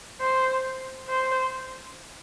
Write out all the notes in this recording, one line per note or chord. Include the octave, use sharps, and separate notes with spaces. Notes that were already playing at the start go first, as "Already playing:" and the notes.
C5
C5